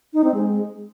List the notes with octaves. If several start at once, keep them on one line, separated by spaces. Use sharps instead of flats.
D#4
C4
G#3